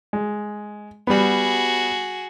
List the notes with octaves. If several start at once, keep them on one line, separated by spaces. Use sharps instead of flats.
G#3
G3 B3 F#4 G#4